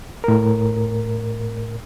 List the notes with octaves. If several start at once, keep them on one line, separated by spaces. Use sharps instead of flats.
A2 A#4